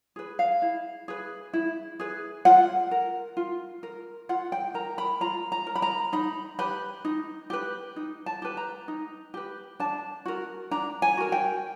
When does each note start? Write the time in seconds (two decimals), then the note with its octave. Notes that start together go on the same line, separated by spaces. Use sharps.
0.16 G#4 B4
0.39 F5
0.62 E4
1.08 G#4 B4
1.53 E4
2.00 G#4 B4
2.45 F4 F#5
2.91 A#4
3.37 F4
3.83 A#4
4.29 F4 F#5
4.52 G5
4.74 A#4 A#5
4.98 B5
5.21 F4 A#5
5.52 A#5
5.67 A#4
5.75 B5
5.82 A#5
6.13 D#4 B5
6.59 G4 B4 B5
7.05 D#4
7.50 G4 B4
7.96 D#4
8.26 A5
8.42 G4 B4
8.57 A#5
8.88 D#4
9.34 G4 B4
9.80 D4 A5
10.26 F#4 A#4
10.71 D4 A#5
11.02 G#5
11.17 F#4 A#4
11.32 G5